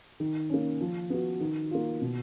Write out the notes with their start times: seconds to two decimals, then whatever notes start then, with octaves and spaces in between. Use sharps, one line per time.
0.20 D#3
0.50 A#3 C#4
0.81 F3
1.10 B3 F#4
1.41 D#3
1.71 A#3 F4
2.02 B2